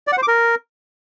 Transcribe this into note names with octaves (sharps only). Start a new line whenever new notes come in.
D5
F#5
C5
D6
A#4